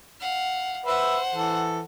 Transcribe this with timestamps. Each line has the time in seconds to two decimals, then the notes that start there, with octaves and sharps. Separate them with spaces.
0.20 F5 F#5
0.86 B4 C5 E5 F#5
1.35 E3 A4